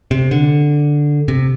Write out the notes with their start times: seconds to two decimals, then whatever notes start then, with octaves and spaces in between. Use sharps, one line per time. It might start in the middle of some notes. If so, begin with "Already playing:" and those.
0.11 C3
0.31 D3
1.28 C3